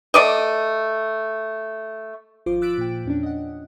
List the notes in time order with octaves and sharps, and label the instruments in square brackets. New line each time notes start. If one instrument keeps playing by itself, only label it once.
[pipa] A3 D5 D#5
[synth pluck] G#1 F3 F4 C5 D6
D6 E6 F#6 A6 B6 D7
A#2 G5
E2 C#4 D4
D#5 F#5